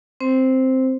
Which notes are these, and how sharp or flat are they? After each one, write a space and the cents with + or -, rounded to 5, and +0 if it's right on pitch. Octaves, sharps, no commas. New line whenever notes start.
C4 +0 C5 +0